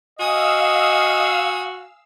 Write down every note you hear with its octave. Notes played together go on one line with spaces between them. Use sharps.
F#4 D#5 F5 G#5 D#6 E6